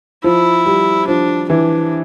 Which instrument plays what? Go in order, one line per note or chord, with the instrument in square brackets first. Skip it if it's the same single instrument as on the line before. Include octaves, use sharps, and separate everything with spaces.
[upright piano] F3 [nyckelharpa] E4
[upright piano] G3
[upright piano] F3 [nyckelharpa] D4
[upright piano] E3 [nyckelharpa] D4